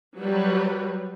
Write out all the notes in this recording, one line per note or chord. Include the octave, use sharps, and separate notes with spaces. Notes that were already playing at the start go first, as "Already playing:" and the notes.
F#3 G3 B4